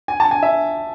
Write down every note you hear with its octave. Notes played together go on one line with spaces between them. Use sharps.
G#5
A5
G#5
E5